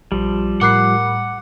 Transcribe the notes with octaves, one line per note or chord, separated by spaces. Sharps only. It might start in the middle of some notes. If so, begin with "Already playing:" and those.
A#1 F3 G3
A2 A#4 F#5 B5 D6 F#6 C7